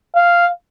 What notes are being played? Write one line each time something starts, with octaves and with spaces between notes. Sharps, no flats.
F5